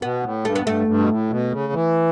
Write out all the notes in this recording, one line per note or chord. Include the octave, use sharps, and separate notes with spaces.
B2 B3
A2
G2 A3
B3
G2 A3
G2
B2
A2
B2
C#3
E3